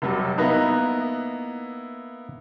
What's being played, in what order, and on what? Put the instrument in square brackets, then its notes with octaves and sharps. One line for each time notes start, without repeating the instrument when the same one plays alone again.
[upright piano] F1 F#3 G3
[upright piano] A#3 B3 E4 [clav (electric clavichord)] D#4 B4 A#5